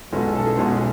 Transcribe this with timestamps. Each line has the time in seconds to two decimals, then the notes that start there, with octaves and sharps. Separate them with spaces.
0.12 B1 B2 G#3 C#4 A4
0.24 A4
0.35 A4
0.46 G#4
0.57 B1 B2 G#3 C#4